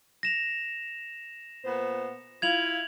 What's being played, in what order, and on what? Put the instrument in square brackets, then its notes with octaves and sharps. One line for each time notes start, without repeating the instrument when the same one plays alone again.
[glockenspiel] A#6 E7 F7
[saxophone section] A#2 B3 C5
[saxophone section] E4 F4 [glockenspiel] G#6 F7 F#7